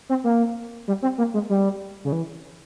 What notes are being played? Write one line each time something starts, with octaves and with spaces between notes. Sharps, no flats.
C4
A#3
G3
C4
A#3
G#3
G3
C#3
E3